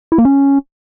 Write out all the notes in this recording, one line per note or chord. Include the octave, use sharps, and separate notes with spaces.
E4
A#3
C#4